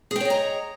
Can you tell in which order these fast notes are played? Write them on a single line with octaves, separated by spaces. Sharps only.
G#4 G5 C#5 D#5 A#5